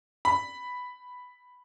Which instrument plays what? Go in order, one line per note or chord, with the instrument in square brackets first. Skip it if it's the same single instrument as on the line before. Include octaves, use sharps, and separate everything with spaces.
[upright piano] B5